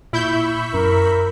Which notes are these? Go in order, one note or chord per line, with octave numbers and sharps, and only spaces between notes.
A#2 E4 B5 C#6 E6 G6
F#2 A#4